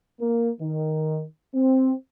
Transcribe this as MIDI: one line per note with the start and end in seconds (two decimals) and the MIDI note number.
0.21 0.49 58
0.61 1.23 51
1.54 1.93 60